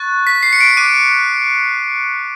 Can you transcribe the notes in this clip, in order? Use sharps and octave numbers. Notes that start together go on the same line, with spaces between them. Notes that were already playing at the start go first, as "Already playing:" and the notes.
Already playing: C#6 F#6 A6
B6
C7
C#7
D7
D6 F#6 D#7